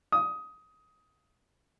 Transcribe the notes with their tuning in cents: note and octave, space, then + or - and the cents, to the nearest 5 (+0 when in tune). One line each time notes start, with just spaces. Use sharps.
D#6 +15